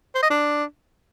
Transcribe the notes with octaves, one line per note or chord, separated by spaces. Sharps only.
C5
D#5
D4